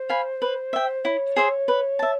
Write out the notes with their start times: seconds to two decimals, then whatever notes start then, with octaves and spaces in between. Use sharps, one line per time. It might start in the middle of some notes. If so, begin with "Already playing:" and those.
Already playing: C5
0.10 F5 G#5 B5
0.42 B4
0.73 E5 G5
1.04 E4 C#5
1.36 G#4 C5 E5
1.68 B4
1.99 E5 A5